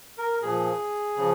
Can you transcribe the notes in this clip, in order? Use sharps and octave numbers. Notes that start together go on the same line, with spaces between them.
A#4
A#2 F3 G#4
C#3 F3